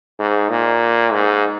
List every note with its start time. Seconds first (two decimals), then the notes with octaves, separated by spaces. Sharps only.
0.19 G#2
0.50 A#2
1.12 G#2